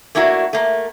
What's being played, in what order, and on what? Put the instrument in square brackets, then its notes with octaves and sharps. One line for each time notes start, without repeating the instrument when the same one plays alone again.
[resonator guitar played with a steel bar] A3 A#3 D4 E4 F#4
A3 A#3